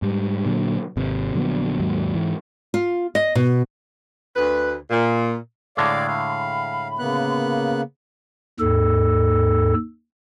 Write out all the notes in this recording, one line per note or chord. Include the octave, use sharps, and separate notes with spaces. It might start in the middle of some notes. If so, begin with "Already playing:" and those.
G#2 G3
A#2 D3 F3 F#3
G#1 C3
A#1 D3 F#3 B3
D#2 G#2 F#3
G#2 E3
F4
D#5
B2
D2 B4
A#2
A2 D3 G#3 D5 F5 D6
F5 B5
C#3 A#3 B3 F#6
D#2 G#2 A4